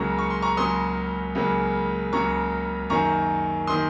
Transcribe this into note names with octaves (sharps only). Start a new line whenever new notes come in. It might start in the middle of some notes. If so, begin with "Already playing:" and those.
Already playing: C#2 C#3 F#3 A#3 A#5 C#6
C#6
C6
A#5 C#6
C#2 C#3 F#3 A#3 C6 D#6
C#2 C#3 F#3 A#3
C#2 C#3 F#3 A#3 A#5 C#6
F#2 D#3 A#3 A#5 C#6
D#3 A#3 C6 D#6